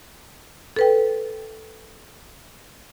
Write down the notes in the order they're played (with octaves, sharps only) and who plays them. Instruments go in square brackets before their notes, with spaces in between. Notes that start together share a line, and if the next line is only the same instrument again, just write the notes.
[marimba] A4 B4 G5